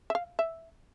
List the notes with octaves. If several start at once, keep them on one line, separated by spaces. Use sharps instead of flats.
E5
F5
E5